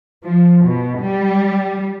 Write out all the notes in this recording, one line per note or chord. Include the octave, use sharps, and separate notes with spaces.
F3
B2
G3